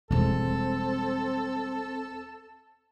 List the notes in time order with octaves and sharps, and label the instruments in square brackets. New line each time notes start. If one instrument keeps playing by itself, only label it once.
[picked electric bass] E1 [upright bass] G3 G#3 [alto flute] C4 [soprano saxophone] A4